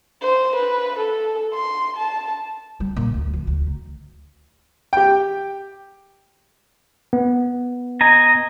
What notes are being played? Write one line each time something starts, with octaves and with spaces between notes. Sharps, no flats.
C5
B4
A4
C6
A5
G3
A#2
D2
F3
D2
D#3
G4 G5
B3
D#5 G#5 A#5